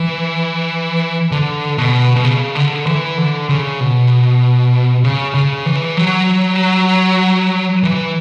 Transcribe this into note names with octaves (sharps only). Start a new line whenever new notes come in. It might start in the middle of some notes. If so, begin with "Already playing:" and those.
Already playing: E3
D3
B2
B2
C#3
D3
E3
D3
C#3
B2
C#3
C#3
E3
F#3
E3